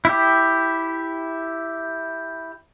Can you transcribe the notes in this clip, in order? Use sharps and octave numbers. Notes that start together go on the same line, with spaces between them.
E4 G4